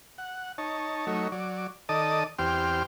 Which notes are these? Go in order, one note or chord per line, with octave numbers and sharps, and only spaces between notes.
F#5
D#4 C#5 A5
F#3 A3 D#4 C#5
F#3 D5
D#3 A4 D5 D#5 A5 D#6
E2 C4 G4 G5 C6 F6